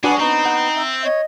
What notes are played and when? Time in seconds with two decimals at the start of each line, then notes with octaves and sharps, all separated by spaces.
0.04 G#3 D4 F#4 B4 D5 F#5 G#5
0.20 B3 C4 D#4
0.45 F#5
0.75 E5
1.05 C#5 D#5